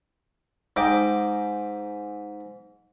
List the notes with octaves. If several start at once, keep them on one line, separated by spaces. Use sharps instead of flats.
G#2 D#5 G5 D6